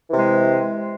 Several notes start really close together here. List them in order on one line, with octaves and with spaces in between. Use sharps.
E3 C3 G#3